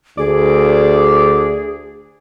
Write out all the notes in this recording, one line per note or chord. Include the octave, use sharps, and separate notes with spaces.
D2 G#4 D5